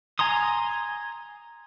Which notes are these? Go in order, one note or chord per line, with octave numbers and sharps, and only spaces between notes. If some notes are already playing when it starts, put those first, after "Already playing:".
G#5 A#5 C6 D#6